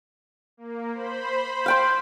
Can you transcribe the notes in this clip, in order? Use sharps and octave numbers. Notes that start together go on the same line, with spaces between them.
A#3
C5 B5
F5 G5 C6